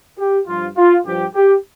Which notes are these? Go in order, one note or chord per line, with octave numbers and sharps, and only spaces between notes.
G4
G2 F3 F4
F4
G2 F3 G4
G4